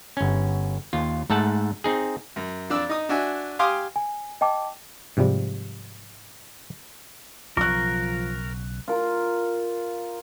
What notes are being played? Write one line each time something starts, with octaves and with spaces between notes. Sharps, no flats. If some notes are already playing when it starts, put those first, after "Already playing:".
G1 C#4
D#2 F4
G#2 A3 A4 F#5 A5
C4 D#4 G#4
F#2
F2 D4 D5 E6
D#4 D#6
D4 F#4 E5 G#5
G4 F5 G#5 C6 D6 D#6
G#5
D#5 G5 A5 D6
G#2 C3 F3 G3
B1 C#3 F3 A#4 C#6 F#6
F4 A#4